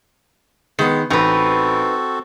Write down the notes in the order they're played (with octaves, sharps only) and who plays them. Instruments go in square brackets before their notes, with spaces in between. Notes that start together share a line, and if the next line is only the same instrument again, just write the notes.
[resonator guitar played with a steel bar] D#3 [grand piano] G#3 B3
[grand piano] A1 [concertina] C4 F#4 A4 [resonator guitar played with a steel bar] D#4 B4